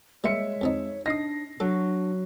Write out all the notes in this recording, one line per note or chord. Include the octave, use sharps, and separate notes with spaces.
G3 G#3 A#3 C#5 E5 C6 C#7
F2 F3 D#4
D4 D#4 D#6 A#6 C7
F#3 D4 A4